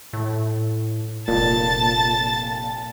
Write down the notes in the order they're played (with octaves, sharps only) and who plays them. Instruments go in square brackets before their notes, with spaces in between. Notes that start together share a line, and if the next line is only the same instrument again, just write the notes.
[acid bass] A2
[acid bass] F1 [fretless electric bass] A#2 [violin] A5 A6